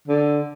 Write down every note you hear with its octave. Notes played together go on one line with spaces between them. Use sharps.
D3